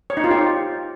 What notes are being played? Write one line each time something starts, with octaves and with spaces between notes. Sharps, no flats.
C#5
D#4
F4
G4